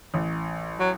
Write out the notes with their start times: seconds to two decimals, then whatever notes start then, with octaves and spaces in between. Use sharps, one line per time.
0.14 A1
0.79 F#3